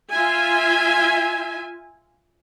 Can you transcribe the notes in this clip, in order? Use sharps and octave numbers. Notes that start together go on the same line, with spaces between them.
F4 E5 G#5